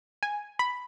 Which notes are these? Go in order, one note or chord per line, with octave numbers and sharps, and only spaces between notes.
G#5
B5